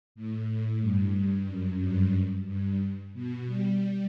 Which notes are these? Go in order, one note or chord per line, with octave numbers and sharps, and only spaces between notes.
A2
A2
G2
F#2
G2
G2
B2
G3